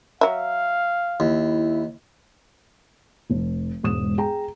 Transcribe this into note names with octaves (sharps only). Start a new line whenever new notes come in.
F#3 E5 F5
D#2 E4
F1
E1 G#2 D#6 E7
G#4 G5 A#5